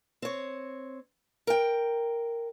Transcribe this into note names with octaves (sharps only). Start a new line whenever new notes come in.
C4 C#5
A#4 G5